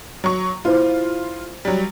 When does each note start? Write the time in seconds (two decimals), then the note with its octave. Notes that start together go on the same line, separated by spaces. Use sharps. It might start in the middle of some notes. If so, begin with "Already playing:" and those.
0.24 F#3 C#6
0.65 E4 F4 C5
1.65 F#3 G3